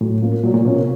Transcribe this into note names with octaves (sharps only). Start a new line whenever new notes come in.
A2 F#3
A#3 C#4 F4
A#2 F#3
A#2
B2 A#3 C#4 F4
C3